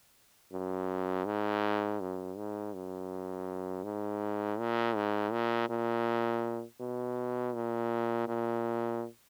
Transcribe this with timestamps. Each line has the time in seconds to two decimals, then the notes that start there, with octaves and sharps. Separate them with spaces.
0.52 F#2
1.26 G#2
2.00 F#2
2.37 G#2
2.74 F#2
3.84 G#2
4.59 A#2
4.96 G#2
5.32 A#2
5.69 A#2
6.80 B2
7.55 A#2
8.27 A#2